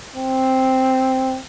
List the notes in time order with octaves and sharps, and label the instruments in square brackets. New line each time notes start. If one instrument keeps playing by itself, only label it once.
[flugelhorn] C4